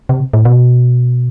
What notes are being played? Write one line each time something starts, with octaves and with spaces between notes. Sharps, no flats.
C3
A2
B2